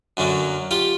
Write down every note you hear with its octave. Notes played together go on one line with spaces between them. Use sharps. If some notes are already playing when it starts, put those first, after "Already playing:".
F#2 D3 F#3 A#3
F4 G4